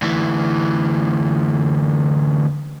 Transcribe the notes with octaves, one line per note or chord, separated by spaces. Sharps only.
D2 E3